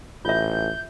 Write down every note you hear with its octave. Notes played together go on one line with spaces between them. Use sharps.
A1 F4 E5 G6